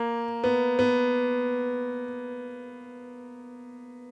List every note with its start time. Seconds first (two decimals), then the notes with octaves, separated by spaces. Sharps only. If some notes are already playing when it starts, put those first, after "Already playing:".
Already playing: A#3
0.44 B3
0.79 B3